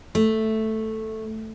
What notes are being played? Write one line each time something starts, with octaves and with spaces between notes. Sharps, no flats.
A3